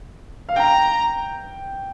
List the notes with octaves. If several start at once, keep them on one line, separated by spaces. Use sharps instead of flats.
F5
G5 A#5